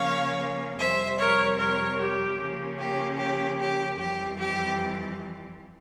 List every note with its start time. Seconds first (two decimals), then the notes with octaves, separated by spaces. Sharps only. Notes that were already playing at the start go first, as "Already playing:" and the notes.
Already playing: C#3 F3 A#3 C#4 C#5 F5
0.78 F2 C3 G3 C5 E5
1.18 A#4 C#5
1.58 A#4 C#5
1.99 G4
2.39 C#3 F3 A#3 C#4
2.79 G4
3.18 G4
3.59 G4
3.98 F2 E3 G3 G4
4.39 G4